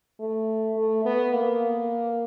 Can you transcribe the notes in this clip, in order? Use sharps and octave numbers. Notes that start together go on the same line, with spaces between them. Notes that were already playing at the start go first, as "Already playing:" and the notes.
A3
A3
B3
A#3